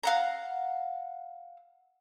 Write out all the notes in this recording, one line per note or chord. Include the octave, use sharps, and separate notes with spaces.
F5 F#5 A#5